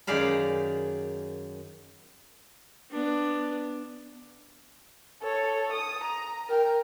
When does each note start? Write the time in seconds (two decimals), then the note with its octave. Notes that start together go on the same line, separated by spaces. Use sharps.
0.07 F#2 D#3 G#4 D5 F5 B5
2.91 B3 D4
5.22 A4 C#5
5.73 D#6
6.03 A#5
6.49 A#4 G5